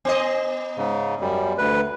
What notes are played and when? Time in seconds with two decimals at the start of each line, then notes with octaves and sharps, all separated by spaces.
0.05 B3 D#5
0.77 G#2 C#3
1.20 F#2 G3
1.58 D2 B4